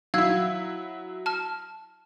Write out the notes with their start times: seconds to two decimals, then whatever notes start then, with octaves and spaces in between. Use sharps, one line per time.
0.14 F#3 E4 F5 E6 G#6
1.26 A5 F6